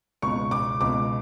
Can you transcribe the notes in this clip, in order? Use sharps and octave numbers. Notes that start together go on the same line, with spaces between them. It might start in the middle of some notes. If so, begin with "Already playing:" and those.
C#2 B2 C#6
D6
C#2 B2 D6